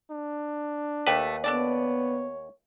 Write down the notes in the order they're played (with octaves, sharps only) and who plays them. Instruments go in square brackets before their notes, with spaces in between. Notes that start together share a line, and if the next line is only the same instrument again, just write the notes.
[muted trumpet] D4
[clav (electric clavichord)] D#2 B4 [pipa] A3 G4 A4
[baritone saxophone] B3 [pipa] D4 A4 D5 [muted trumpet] C#5